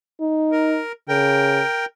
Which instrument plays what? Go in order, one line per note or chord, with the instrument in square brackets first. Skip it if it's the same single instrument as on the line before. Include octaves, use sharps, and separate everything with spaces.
[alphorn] D#4
[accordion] A#4
[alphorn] C#3 [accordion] A#4 G5